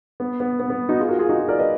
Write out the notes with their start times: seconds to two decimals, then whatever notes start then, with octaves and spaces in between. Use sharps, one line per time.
0.20 B3
0.40 B3
0.60 B3
0.70 B3
0.89 D#4 F#4
1.00 F4 G#4
1.09 F#4 A#4
1.19 F4 G#4
1.29 D#4 F#4
1.39 F4 G#4
1.48 A#4 D5
1.59 B4 D#5